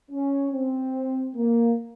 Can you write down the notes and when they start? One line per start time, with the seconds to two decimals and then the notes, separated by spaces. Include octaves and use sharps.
0.11 C#4
0.52 C4
1.36 A#3